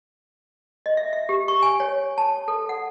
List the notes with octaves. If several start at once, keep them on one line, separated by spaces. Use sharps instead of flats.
D#5
E5
E5
G4
C#6
G#5
C#5
A5
A4
F#5